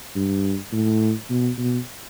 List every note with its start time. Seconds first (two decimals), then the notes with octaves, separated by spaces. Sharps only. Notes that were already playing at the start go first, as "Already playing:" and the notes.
0.15 G2
0.72 A2
1.30 B2
1.58 B2